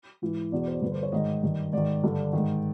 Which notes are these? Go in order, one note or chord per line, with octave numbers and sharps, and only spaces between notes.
G#2 E3
E2 B2 D5
C5
G2 D3 B4
C5
C#5
G#2 D#3 D#5
G2 D#3
G#2 D#3 D5
G2 D3
G#2 D#3